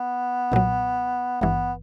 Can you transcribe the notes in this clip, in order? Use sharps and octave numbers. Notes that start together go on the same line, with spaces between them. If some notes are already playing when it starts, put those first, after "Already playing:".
Already playing: B3
B1 A#2 F#3
G#1 G2 E3 B3